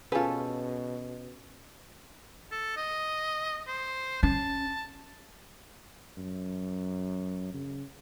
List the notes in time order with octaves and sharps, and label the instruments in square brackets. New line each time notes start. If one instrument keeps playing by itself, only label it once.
[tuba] B2 [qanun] C#4 A4 [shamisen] F4 B4 [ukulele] G#4 C5 G#5
[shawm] A4
D#5
C5
[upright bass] C#4 [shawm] A5
[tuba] F#2
C#3